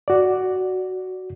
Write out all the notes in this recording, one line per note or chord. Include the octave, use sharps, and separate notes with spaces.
F#4 D5